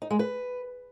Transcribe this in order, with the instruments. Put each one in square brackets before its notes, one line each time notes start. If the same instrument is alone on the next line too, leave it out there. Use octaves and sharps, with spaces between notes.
[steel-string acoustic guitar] D#4
G#3
B4